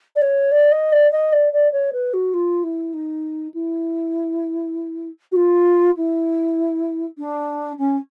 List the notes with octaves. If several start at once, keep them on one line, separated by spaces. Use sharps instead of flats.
D5
C#5
D5
D#5
D5
D#5
D5
D5
C#5
B4
F#4
F4
E4
D#4
E4
F#4
F4
E4
D4
C#4